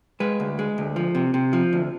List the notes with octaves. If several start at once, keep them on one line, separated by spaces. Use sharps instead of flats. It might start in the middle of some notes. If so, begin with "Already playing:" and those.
G#3 B4
D2
G#3
D2
F3
C3
C3
F3
D2